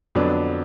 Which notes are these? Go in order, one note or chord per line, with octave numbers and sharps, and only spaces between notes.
F2 D3 F#3 B3 D4